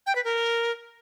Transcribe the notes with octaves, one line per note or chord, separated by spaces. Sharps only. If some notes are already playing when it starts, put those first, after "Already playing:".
G5
B4
A#4